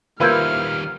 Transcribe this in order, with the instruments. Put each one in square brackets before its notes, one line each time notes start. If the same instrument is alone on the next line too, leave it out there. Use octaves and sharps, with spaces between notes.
[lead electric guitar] D#3 G3 [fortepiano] A#3 F4 B4 [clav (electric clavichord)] E4 C5 [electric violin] F6